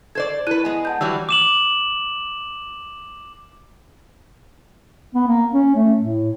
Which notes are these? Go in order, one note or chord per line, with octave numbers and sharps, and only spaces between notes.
A4 C5 D5 G#6
E4 A4 B4 F#6 D#7
G#3 B3
F#5 A5 G6
E3 F#3 G3 E6
D6 E7 F#7
B3
A#3
C#4
A3
A2